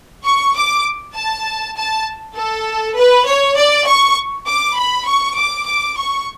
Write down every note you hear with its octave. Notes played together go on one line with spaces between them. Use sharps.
C#6
D6
A5
A5
A4
B4
C#5
D5
C#6
D6
B5
C#6
D6
D6
C#6